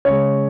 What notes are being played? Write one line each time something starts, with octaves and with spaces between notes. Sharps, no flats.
C#3 G#3 C#5